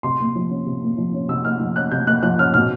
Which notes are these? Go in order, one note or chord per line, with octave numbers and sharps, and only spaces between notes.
C3 C6
A#3
F3
C#4
C3
A#3
F3
C#4
C3 E6
A#3 F6
F3
C#4 F#6
C3 G6
A#3 F#6
F3 F#6
C#4 F6
B2 F6